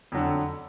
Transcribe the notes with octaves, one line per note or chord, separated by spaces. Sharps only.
F2 D3 F#3